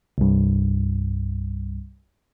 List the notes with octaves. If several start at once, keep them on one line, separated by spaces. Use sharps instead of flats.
C2 G2